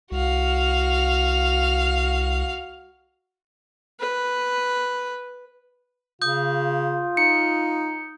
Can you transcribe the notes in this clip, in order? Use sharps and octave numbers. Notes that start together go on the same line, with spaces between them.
C2 F#4 F5
B4
C#3 F4 D#6 G6
D#4 C#7